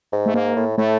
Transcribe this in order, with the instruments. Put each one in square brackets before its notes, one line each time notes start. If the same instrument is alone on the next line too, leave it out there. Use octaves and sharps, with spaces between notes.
[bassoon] G#2
[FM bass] A3
[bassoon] G#2 [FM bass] A#3
[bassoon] A2
[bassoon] A2 [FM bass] A3